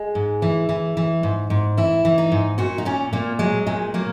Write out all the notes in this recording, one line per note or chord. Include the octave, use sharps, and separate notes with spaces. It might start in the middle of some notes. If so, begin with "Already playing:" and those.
Already playing: G#3
G#2
E3
E3
E3
G#2
G#2
E3 E4
E3
D#4
G#2
A#2 F#4
D#4
A#2 C#4
A#2 A#3
F#3 G#3
A#2 G#3
F#3 A#3